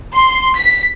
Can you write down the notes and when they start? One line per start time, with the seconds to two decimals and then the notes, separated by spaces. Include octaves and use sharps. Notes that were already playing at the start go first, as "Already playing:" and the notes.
0.15 C6
0.58 B6